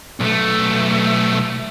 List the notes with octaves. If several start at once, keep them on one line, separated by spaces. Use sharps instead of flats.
B1 A3